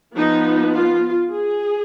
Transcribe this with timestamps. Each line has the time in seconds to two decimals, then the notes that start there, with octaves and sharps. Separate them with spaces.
0.16 F3 B3 D#4
0.74 F4
1.33 G#4